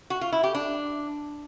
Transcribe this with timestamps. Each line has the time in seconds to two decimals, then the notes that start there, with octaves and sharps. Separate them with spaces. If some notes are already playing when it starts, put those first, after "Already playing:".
0.10 F#4
0.21 F4
0.32 E4
0.43 G4
0.55 D4